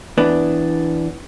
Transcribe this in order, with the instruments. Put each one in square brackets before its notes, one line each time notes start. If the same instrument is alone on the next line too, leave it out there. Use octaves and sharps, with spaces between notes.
[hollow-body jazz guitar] E3 B3 D4